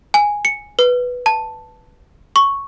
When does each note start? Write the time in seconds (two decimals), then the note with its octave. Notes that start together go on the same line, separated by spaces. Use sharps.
0.14 G#5
0.45 C#7
0.79 B4
1.26 A5
2.36 C#6